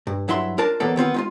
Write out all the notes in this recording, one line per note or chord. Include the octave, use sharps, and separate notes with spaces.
G2
G2 F#3 E4 E5 C6
D4 F4 A#4 D5 A5
B1 E2 A#3 B3 A4 D5
D#3 B3 C4 F4
G#3 D#4 F4